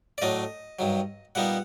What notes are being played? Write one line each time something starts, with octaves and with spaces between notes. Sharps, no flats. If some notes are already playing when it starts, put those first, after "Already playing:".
D5
A2 F#3 A3 D4 D#5
G2 D#3 F#3
A#2 G3 B3 D#4 F#5